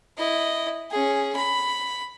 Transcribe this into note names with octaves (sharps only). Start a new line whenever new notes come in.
E4 D#5
C#4 G#4
B5